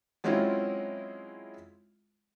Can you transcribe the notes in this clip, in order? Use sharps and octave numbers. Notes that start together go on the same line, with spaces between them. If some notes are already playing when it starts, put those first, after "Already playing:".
F#3 G#3 C4 C#4 E4 F4